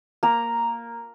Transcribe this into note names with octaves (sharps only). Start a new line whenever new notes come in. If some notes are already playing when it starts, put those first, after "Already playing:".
A#3 A#5